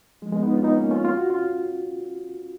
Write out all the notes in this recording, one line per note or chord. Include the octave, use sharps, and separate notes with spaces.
F3 G#3
G#3 B3
B3 D#4
C#4 F4
B3 D#4
A#3 C#4
C#4 F4
F4
F#4
C#4 F4